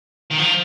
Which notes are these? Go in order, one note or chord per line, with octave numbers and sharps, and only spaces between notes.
D#3
F3